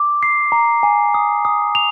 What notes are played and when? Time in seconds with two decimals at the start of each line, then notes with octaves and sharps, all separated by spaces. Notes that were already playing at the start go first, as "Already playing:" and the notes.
Already playing: D6
0.23 C7
0.52 A#5
0.83 G#5
1.14 D#6
1.45 D#6
1.75 F7